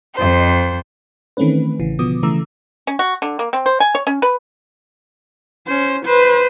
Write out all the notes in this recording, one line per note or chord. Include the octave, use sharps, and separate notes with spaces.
F2 C5
D#3 E3 A3 C4 C#4 B4
A1 C#3 E3
B2 D3 F3 B3 D6 D#6
C#3 E3 A3 A#5 D6 E6
C#4
F#4
D3
A#3
C4
C5
G#5
C#5
C#4
B4
C#4 C5
B4 C5